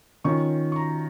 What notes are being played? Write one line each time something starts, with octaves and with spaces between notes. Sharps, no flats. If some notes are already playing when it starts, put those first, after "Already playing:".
D#3 C#4 F4 C#6
C#6
A#5